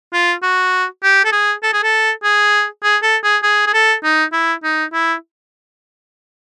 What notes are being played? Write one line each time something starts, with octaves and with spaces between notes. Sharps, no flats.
F4
F#4
G4
A4
G#4
A4
G#4
A4
G#4
G#4
A4
G#4
G#4
G#4
A4
D#4
E4
D#4
E4